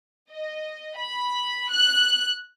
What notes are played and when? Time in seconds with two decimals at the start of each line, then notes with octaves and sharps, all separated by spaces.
0.31 D#5
0.97 B5
1.70 F#6